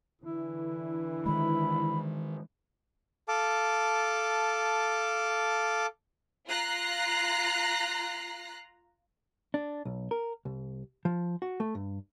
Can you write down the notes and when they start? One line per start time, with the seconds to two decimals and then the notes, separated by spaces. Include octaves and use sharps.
0.21 D3 E3 E4
1.26 D#3 G#3 B5
3.28 A4 F5 A5 D6
6.48 F4 A#5 F#6 C7
9.54 D4
9.85 B1
10.11 A#4
10.45 C2
11.05 F3
11.42 F#4
11.60 A3
11.75 G2